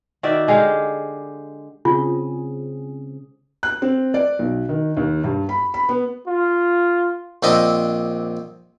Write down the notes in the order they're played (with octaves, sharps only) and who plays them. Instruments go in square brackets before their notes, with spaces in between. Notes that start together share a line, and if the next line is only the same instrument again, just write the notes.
[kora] D#3 F#4 D5 E5
D3 G#3 G4 F5
[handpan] C#3 C4 G#4 [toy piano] F4
[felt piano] F#6
C4
D5
B1
D#3
D#2
G2
B5
B5
B3
[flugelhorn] F4
[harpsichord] A#1 C4 D4 D#5 E5